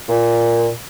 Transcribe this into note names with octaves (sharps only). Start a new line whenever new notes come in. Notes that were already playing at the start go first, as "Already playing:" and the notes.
A#2